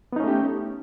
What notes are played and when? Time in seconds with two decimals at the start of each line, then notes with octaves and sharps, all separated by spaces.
0.13 B3
0.16 D#4
0.20 C#4
0.24 A3
0.28 G4